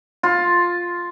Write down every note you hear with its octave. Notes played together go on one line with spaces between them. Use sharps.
F4